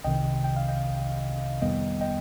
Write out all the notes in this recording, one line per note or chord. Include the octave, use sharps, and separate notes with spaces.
C2 C3 D#3 D#5 G5
G5
F5
D#5 G5
F2 D#3 G3 B3 D#5 G5
D#5 G5